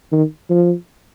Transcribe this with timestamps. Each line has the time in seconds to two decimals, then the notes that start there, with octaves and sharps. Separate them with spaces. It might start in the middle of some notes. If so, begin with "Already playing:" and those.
0.12 D#3
0.50 F3